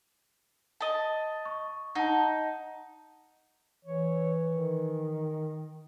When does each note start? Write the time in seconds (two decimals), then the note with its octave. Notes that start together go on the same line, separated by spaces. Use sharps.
0.81 D#5 A5
1.45 C#6
1.95 D#4 F#5 A5
3.85 E3 C#5
4.48 D#3